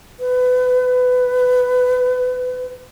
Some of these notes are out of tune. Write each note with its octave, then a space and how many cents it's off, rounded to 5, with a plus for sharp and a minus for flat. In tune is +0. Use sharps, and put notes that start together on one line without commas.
B4 +25